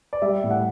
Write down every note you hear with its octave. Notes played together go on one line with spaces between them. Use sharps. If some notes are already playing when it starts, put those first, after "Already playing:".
D5
G3 E5
A2
F#5